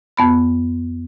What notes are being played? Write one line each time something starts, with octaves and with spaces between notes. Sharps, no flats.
F2 B3 B5